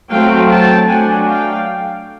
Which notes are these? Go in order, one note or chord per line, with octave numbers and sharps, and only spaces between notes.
F#3 A3 C4 F5 G5
G5 A5
F#3 A3 D4 F#5 G#5
F5 G5